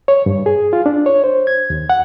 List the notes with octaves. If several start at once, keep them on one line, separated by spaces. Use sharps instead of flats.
C#5
G2
G#4
F4
D4
C#5
C5
G#6
D#2
F#5